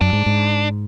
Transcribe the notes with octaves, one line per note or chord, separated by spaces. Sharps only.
F#2 D4
G#2
G#2